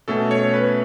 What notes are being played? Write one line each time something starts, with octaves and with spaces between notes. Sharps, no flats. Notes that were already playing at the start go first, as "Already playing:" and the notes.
B2 A3 C#4 A4
C#5
B4